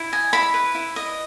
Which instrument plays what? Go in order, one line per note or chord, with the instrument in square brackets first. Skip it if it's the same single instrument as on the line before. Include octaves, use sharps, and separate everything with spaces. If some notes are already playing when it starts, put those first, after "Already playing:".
Already playing: [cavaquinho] E4
D#5 G#5
E4 B5
B4
E4
D#5